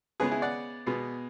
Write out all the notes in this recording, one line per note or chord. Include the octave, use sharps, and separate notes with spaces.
C#3 G#3 B3 G#4 B4
E4 G#4
D5 F#5
B2 G#3 B3